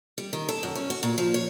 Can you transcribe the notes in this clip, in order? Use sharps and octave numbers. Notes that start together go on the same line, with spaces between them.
G3
D#3
A4
F#2
C#4
F#4
A#2
F3
C#5